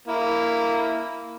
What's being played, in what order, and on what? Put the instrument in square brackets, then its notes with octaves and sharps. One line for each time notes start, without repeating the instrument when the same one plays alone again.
[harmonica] A#3 E4